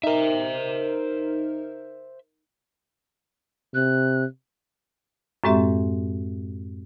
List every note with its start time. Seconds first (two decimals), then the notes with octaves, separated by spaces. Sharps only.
0.03 D#4 A#4 C5 E5
3.74 C3 F#6
5.44 F#2 A2 G#3 C4 G4 E5